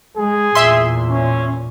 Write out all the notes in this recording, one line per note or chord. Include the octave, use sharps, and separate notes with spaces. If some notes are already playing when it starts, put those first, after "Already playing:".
G#3 G#4
E2 A#2 E5 C6
C#4